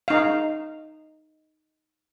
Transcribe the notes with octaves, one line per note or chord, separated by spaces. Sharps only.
D#4 F5